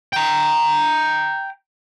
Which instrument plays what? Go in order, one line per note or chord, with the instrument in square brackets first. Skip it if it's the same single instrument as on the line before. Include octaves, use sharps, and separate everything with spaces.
[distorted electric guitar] G5 A#5